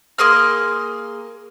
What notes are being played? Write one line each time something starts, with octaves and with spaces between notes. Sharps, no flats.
A#3 G#4 C6 F6